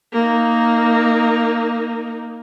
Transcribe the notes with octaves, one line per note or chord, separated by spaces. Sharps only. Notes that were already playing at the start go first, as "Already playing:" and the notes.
A#3 D#4